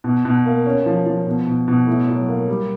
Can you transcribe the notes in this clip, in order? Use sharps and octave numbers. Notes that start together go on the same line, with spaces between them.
B2
B2
A#3
C#4
F3
F3
B2
B2
B2
A2
F#3
A#3
G3